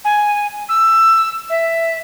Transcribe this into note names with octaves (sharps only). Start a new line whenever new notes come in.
G#5
E6
E5